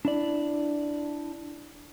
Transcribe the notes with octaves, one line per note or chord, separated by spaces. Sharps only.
D4 E4 D5